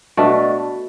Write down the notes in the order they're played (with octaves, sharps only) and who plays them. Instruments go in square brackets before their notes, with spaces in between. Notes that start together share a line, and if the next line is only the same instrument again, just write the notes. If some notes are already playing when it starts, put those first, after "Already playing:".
[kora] B2 A3 D4